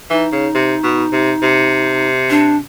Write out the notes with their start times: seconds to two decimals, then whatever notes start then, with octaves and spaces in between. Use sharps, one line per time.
0.10 E3 D#4
0.32 C#3
0.54 C3
0.84 B2
1.12 C3
1.42 C3
2.30 D4